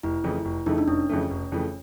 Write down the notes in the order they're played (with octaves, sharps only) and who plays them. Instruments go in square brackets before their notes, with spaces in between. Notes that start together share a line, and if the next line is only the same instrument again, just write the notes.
[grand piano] F1 [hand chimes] E4
[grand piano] F2 C#3 E3 A3
F1
[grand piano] F2 C#3 E3 A3 [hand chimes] D#4
[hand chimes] D4
[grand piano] F1 [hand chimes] C#4
[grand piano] F2 C#3 E3 A3
F1
F2 C#3 E3 A3